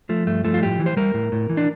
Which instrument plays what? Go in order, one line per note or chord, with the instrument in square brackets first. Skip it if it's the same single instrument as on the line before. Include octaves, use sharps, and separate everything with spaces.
[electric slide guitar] F3 A3
G2 A3
F3 A3
F4
A2 G4
E3
C5
G3 A#4
A2
A2
E3
D4